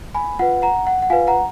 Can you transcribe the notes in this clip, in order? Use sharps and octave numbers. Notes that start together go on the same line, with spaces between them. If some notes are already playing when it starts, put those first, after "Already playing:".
G#5 B5
F4 B4 F#5
F#5 A#5
F#5
F#5
F4 B4 F5 G#5
F#5 A#5